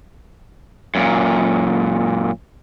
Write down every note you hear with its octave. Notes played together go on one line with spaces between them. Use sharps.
F#2 A#2